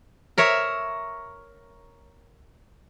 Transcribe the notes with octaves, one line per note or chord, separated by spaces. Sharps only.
A#4 C#5 E5